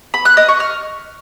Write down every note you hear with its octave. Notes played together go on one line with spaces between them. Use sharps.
B5
F#6
D#5
C#6
F6